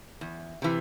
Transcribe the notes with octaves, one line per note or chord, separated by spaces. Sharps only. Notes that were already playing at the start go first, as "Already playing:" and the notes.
E2
C3 E3